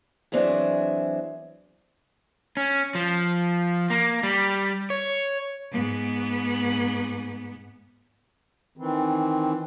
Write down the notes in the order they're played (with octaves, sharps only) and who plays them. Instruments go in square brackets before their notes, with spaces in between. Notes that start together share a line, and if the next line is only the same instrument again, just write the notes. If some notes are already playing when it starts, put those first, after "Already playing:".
[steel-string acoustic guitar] E3 F#3 C4 D4 E4 G#4
[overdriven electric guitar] C#4
F3
A#3
G3
C#5
[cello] G#2 B3
[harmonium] D#3 E3 C4